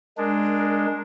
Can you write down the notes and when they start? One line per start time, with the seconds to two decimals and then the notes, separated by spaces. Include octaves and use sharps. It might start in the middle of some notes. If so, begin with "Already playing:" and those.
0.18 G#3 D4 A#4